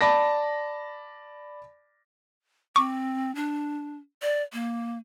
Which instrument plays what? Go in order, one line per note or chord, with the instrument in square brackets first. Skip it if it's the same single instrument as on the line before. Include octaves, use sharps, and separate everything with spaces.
[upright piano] D5 A5 B5 A#6
[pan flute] C4 [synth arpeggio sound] C#6 D6
[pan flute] D4
D5
A#3